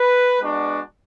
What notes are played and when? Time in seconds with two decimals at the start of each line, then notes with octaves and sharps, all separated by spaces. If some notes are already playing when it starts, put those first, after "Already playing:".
Already playing: B4
0.39 G#3 B3 D4 F#4